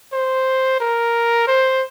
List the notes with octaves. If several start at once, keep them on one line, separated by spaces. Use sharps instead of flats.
C5
A#4
C5